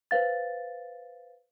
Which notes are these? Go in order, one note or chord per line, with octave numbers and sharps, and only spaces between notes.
B4 C5 F5 A6